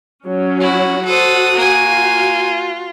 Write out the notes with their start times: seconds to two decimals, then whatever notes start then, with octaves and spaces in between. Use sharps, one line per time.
0.25 F#3 C#4
0.60 E4 F#4
1.05 F#4 A4 C5 F#5 D#6
1.55 A#3 G#5
1.88 F4